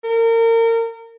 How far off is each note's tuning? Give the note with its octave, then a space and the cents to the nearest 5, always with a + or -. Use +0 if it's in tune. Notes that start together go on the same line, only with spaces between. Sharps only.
A#4 -30